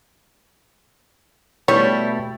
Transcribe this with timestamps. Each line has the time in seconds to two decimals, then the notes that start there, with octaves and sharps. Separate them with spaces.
1.68 B2 G3 A3 E4 C#5